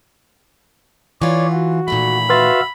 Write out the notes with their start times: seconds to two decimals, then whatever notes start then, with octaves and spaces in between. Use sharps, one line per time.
1.22 E3 F4 C#5 D5
1.52 F#4
1.88 A#2 D#3 A3 B5
2.30 F#4 B4 E5 F5 C6 A6